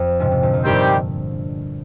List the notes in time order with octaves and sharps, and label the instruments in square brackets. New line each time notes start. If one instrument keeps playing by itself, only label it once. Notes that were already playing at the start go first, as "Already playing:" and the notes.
Already playing: [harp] F2
G#2 C3
G#2 C3
A#2 D3
F2
[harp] G2 [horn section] D#3 G3 C4 G4